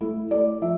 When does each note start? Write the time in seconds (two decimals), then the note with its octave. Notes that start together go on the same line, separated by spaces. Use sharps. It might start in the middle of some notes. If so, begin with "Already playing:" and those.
0.01 A3 E4
0.31 A3 D5
0.62 F3 E5